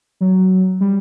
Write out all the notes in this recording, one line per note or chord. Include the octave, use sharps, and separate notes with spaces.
F#3
G3